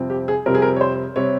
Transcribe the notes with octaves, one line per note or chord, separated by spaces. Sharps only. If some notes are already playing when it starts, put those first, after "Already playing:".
Already playing: F2 C3 G3 C4
G4
G#4
F2 C3 G3 C4 A#4
G#4
A#4
C#5
C5
C3 G3 C4 C#5